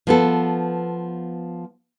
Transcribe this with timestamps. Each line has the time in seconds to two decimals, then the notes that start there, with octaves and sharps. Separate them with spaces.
0.07 F3 B3 A4